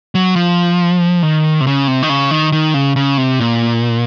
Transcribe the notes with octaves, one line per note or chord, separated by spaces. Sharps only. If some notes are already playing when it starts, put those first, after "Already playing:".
F#3
F3
D#3
C3
C#3
C3
D#3
C#3
D#3
D#3
C#3
C#3
C3
A#2